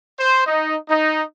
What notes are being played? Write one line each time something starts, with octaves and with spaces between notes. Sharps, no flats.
C5
D#4
D#4